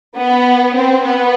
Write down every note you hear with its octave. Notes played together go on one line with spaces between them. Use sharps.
B3
C4
B3